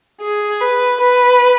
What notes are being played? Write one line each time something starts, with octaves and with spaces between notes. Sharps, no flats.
G#4
B4
B4